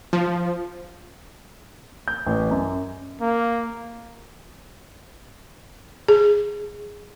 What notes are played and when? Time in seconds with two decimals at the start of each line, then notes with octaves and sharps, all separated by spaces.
0.13 F3
2.08 G6
2.26 A1
2.51 F#2
3.21 A#3
6.08 G#4